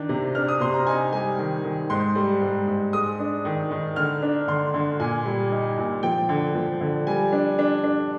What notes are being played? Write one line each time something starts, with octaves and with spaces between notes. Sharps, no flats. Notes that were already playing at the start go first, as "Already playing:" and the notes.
Already playing: D#3 D4
C3
D4 F6
D#6
C3 C6
A#5
D#4 G#5
G3 G#5
D#3
D#3
G#2 C6
G3
G#2
G#2
G#3 D#6
D4
D#3
D#3
D3 F6
D4
D3 C6
D3
A#2 G#5
G3
D#4
A#2
F3 G5
D3
F3
D3
G3 G#5
D4
D4
D4